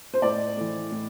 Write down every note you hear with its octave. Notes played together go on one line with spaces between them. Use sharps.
C5
A2 D5
E3 A3
A2